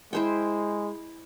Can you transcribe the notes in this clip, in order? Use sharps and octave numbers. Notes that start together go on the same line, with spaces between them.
G#3 E4 C5 G5